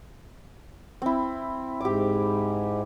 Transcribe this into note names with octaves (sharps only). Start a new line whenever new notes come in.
C4 E4
G#2 G4 D6